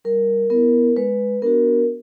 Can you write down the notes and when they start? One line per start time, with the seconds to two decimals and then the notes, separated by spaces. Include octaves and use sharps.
0.04 G3 A#4
0.50 B3 E4 A#4
0.97 G#3 B4
1.42 B3 D4 F#4 A#4